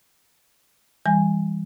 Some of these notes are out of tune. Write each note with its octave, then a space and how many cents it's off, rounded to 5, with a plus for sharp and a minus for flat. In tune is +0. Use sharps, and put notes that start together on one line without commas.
E3 +0 G3 +30 G#5 -5